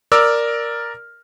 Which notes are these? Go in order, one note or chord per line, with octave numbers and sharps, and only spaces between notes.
A#4 D5 D6 E6 F6